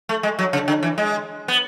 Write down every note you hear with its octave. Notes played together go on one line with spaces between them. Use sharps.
A3
G#3
F#3
C#3
D3
E3
G#3
B3